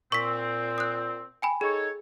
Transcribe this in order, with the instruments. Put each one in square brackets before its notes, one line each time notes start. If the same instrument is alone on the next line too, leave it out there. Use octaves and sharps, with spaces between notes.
[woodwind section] A#2 C4 [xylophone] C#6 B6
[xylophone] D#6 F#6
G5 G#5 B5
[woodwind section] D#4 A4 C#5 [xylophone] G#4